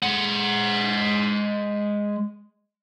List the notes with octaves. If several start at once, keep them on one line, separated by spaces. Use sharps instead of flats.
G#3 F#5